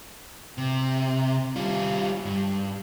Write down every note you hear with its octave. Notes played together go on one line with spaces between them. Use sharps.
C3
G3 F4
G2